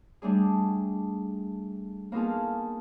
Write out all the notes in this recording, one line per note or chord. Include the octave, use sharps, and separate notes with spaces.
G3 A3 D4 G#4
A#3 B3 D#4 F4 G#4 A4